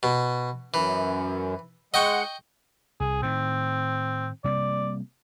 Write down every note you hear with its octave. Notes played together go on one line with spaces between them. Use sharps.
B2
F#2 E3
G#3 D#5 F#5 G5 C#6
C2 G#4
A2 D#3 C4
C3 G3 A#3 D5